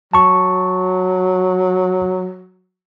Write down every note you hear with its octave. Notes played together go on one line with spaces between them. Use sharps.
F#3 A5 C#6